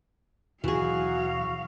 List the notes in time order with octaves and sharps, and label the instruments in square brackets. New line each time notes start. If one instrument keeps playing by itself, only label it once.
[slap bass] D#2 B2 C4 [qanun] E3 G#4 [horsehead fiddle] F#3 F5 [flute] F#4